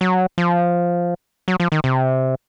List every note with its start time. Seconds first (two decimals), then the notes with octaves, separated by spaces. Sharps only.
0.01 F#3
0.38 F3
1.48 F#3
1.60 F3
1.72 D#3
1.84 C3